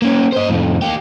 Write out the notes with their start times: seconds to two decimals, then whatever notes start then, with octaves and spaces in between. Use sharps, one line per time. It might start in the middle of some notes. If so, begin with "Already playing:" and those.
0.02 A#3 C#4
0.32 C5 D#5
0.49 F2 A2
0.82 A#3 G4